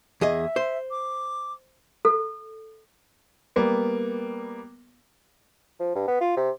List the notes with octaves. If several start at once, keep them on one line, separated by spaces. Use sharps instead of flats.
E2 G#4 D#5 E5
C5
D6
A4
G3 A#3 B3
F3
G2
B3
F4
C3